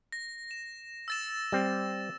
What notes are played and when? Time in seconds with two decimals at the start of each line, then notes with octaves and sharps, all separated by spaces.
0.12 A#6
0.51 E7
1.08 E6 A6 E7
1.52 G3 C4